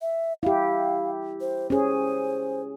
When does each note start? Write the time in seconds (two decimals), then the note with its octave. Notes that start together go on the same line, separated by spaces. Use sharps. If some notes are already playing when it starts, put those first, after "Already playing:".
0.02 E5
0.43 E4 G4 F5
1.41 C5
1.70 C#4 G#4 C5